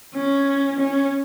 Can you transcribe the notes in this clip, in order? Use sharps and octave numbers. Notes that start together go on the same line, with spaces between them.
C#4
C#4